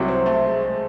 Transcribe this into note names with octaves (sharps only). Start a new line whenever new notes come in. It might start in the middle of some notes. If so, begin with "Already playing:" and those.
Already playing: C2 C3 F#3
C4
A3
G#3
G#3